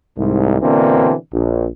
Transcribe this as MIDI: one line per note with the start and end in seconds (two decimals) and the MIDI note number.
0.18 0.57 36
0.18 0.57 44
0.61 1.14 47
0.61 1.14 50
0.61 1.14 52
0.61 1.14 58
0.61 1.14 60
0.61 1.14 62
1.33 1.66 34